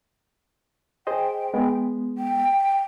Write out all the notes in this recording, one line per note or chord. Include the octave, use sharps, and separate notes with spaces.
G#4 C5 D#5 G5
G#3 B3
G5